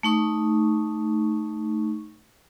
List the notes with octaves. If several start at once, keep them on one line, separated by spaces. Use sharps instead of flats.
A3 D#4 C#6